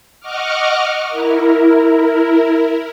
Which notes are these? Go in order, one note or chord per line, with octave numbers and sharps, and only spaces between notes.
D#5 F#5 C#6 D6 F6
E4 A#4